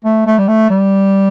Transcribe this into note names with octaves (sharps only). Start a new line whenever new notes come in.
A3
A3
G3
A3
G3